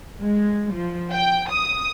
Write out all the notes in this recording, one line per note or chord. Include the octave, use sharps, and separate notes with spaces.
G#3
F3
G5
D#6